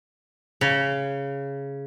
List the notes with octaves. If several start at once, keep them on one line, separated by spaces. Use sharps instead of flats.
C#3